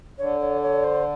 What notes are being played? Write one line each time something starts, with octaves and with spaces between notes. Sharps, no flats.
D3 C#5
C#5
C#5
C5